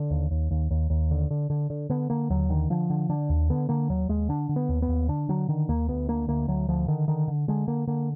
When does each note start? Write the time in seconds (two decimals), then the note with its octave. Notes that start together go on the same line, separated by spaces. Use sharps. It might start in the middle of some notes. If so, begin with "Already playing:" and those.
Already playing: D3
0.10 D#2
0.31 D#2
0.51 D#2
0.71 D#2
0.90 D#2
1.11 D3
1.31 D3
1.50 D3
1.70 D3
1.90 D3 B3
2.10 D3 A#3
2.30 D#2 F#3
2.50 D3 D#3
2.70 D3 F3
2.90 D3
3.09 D3 D4
3.29 D#2
3.50 D3 B3
3.69 D3 A#3
3.90 D#2 F#3
4.09 D#2 G#3
4.29 D3 D4
4.49 D3
4.56 B3
4.69 D#2
4.82 B3
4.88 D#2
5.08 D3 D4
5.29 D3 F#3
5.48 D3 D#3
5.69 D#2 A#3
5.88 D2 B3
6.08 D3 A#3
6.28 D2 A#3
6.48 D2 F#3
6.68 D2 F3
6.88 D3 D#3
7.08 D3 D#3
7.28 D3
7.48 D3 G#3
7.67 D3 A#3
7.87 D3 A#3